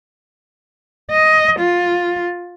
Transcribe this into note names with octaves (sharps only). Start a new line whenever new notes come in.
D#5
F4